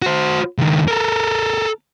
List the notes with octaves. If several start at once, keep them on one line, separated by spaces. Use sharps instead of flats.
F#4 C5
C#2 D#3
A4 A#4